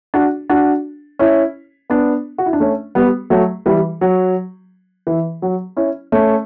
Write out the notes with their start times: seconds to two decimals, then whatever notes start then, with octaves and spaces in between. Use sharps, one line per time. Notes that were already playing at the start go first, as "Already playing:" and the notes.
0.14 D4 F#4
0.50 D4 F#4
1.19 C#4 E4
1.90 B3 D4
2.38 F#4
2.46 E4
2.53 D4
2.60 A3 C#4
2.95 G3 B3
3.30 F#3 A3
3.66 E3 G3
4.01 F#3
5.07 E3
5.42 F#3
5.76 C#4 E4
6.12 A3 C#4